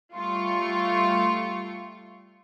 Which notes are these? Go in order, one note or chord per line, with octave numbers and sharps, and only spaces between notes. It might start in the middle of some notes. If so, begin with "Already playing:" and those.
G3 A3 F4 C#6